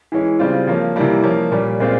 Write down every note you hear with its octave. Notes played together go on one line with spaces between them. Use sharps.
E3 G#3 C#4
C#3 G3 C4 F4
F3 A#3 C#4
C3 E3 G3 A#3
F3 A#3 C#4
A#2 G3 C#4
A#2 G#3 C4 F4